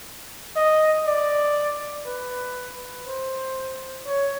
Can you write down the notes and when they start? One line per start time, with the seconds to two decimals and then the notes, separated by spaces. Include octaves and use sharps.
0.56 D#5
1.07 D5
2.07 B4
3.07 C5
4.07 C#5